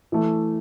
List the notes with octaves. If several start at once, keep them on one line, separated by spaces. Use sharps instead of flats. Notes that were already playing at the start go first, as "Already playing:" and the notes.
E3 A3